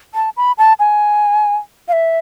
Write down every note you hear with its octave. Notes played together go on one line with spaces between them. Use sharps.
A5
B5
A5
G#5
F5
E5